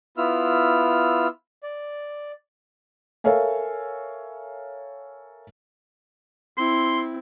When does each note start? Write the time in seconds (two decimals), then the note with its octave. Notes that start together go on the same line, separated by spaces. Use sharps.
0.17 B3 E4 F4 E6 F6
1.63 D5
3.24 A4 A#4 C#5 E5 F5 G#5
6.58 C4 E4 C6